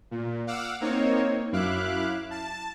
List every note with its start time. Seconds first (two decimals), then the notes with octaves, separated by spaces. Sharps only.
0.11 A#2
0.47 F5 F#5 D6 E6
0.81 A#3 C4 D#4 C#5
1.52 F#2 E4 E5 F5 D6 F#6
2.31 A5